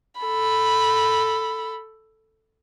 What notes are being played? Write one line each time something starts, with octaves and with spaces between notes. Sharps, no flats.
A4 B5